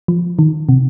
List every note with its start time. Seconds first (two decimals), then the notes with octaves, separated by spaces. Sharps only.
0.08 F3
0.39 D#3
0.69 C3